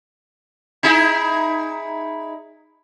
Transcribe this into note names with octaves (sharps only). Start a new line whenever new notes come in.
D#4 E4 G#4